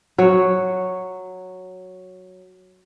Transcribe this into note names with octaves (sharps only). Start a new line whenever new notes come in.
F#3 C#5